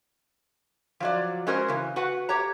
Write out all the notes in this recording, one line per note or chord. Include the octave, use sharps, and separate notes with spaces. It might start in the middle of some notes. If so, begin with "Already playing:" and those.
F3 F#3 D5
G#3 C#4 F#4 G#4 A#4 C5
C#3 E3
F#4 B4 F#5
G4 C#5 A#5